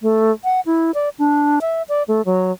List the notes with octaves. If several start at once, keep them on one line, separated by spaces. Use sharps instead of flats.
A3
F#5
E4
D5
D4
E5
D5
A3
F#3